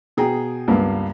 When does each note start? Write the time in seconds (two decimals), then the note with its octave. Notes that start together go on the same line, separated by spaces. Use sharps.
0.17 B2 G#4 G5 A#5
0.68 C#2 G2 A#3 B3